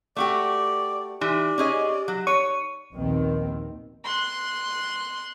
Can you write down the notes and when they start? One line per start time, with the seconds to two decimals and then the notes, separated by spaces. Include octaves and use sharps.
0.16 A3 F#4 G4 D5
1.21 E3 D#4 G4 D5
1.58 C#4 G#4 D#5
2.08 F#3
2.27 C#5 C#6 D#7
2.93 A#1 D#2 B2 D#3 C4
4.04 C6 F#6